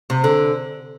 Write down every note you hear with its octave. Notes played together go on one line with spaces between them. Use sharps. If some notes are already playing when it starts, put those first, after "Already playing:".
C3
D3